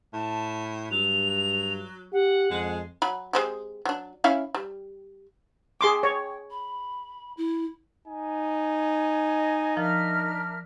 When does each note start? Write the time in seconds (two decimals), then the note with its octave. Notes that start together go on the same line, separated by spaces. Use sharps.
0.13 A2 A5
0.91 G2 F#3 F7
2.12 G4 F#5
2.50 F2 G#3
3.02 F#3 B5
3.33 G#3 C4 G4
3.85 F#3 D4
4.24 C#4 E4 F5
4.54 G3
5.81 G#4 G5 C6 D6
6.03 C#5
6.51 B5
7.37 E4
8.08 D#4 G#5
9.32 D#5
9.77 F3 D4 A#4 E5 F6